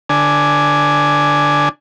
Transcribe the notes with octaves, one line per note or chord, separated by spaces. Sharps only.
D3 D4 G#5